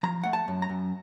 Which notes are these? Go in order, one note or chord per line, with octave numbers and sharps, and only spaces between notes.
F3 A#5
A3 F#5
A5
F#2
A#5
F#2